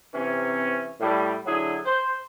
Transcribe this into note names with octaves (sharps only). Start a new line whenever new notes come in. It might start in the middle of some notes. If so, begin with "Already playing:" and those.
C3 E3 C4 C#4
A2 G3
D3 F#3 E4 G#4
C5